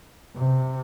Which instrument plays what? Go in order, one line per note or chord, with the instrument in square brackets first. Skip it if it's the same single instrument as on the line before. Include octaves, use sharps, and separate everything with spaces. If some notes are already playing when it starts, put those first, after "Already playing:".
[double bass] C3